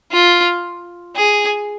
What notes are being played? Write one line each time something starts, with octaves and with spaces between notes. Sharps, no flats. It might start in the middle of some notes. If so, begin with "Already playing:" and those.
F4
G#4